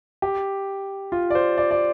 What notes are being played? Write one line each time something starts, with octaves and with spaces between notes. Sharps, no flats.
G4
F4
D5
C5
D5
D5